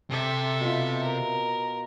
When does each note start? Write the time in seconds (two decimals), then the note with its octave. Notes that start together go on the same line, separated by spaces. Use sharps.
0.11 C3 A4 E5
0.61 B2 F4
1.03 A#4